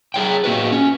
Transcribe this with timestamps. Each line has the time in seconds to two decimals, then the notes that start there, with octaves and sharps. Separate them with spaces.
0.14 G#4 C#5 G5
0.44 A#3 F#4 B4
0.72 C#4